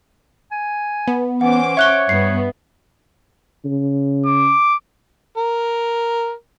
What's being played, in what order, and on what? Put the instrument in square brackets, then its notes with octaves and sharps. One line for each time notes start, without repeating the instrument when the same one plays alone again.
[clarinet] G#5
[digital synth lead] B3
[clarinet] E3 [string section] C#4 C5 D6 [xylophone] F#5
[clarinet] C#5 [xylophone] E5 F#6 G7 [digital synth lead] C#6
[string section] G2 B3 [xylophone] C7
[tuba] C#3
[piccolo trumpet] D6
[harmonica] A#4